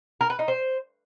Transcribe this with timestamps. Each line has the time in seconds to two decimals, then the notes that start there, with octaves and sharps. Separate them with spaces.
0.21 A#4
0.30 B4
0.39 D#4
0.48 C5